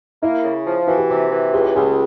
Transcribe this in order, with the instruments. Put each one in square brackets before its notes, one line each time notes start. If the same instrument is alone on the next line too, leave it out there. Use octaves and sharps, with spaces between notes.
[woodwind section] A#3 [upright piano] E4
[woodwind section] C#3
F3
[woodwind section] E3 [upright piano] F#4
[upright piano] G4
[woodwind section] C3 [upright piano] F#4
[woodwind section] E3
[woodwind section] C#2 [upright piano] G4
[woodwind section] C#2 [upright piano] G#4